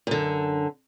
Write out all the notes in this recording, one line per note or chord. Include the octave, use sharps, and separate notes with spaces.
F#2 D3